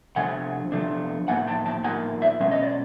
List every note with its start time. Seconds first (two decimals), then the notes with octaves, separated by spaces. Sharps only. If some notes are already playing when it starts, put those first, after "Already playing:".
0.16 C3 F3 A3 D4 F#5 G#5
0.72 C3 F3 A3 D4
1.28 A2 F3 A#3 D#4 F#5 G#5
1.47 G5 A5
1.66 G5 A5
1.84 A2 F3 A#3 D#4 F#5 G#5
2.22 D5 E5
2.40 B2 G#3 C#4 E5
2.51 D#5
2.63 D5